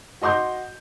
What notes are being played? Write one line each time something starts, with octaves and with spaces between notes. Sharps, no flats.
F#4 D#5 C6 D6 G6